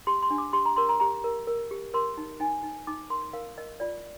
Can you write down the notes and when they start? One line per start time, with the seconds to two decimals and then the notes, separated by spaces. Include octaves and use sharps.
0.07 G4 C6
0.23 C6
0.30 D4
0.38 D6
0.53 G4 C6
0.65 A#5
0.76 A#4 C6
0.89 A#5
1.00 G4 A#5
1.24 A#4
1.47 A#4
1.71 G4
1.94 A#4 C6
2.17 D#4
2.40 D#4 G#5
2.63 D#4
2.87 D#4 D6
3.10 A#4 C6
3.33 A#4 F5
3.58 A#4 D#5
3.80 F4 D5